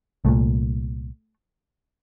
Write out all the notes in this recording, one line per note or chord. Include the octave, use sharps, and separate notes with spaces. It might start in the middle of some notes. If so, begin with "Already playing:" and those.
C2 A#2 A3